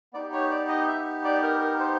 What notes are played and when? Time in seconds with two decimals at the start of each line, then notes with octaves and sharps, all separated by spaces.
0.13 B3 D#4 G4 D5
0.33 C#5
0.51 D5
0.69 D#5
0.88 E5
1.25 D5
1.43 A#4
1.61 A#4
1.79 C5